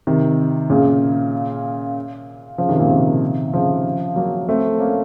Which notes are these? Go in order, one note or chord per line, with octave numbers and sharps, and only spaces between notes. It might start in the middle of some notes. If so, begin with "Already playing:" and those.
C3 D#3
A#2 C#3
C#3 F3
C3 D#3
A#2 C#3
C3 D#3
C#3 F3
F#3 A#3
A3 C4
A#3 C#4